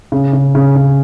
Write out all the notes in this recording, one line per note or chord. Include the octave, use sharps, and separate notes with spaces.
C#3
C#3
C#3
C#3